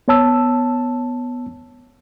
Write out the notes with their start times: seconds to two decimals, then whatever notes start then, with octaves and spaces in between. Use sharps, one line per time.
0.08 B3 C#5 A5 E6